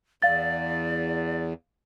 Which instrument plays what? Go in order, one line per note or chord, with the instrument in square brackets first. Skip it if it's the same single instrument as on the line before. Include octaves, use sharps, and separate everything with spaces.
[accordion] E2 [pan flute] D5 [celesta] F5 A6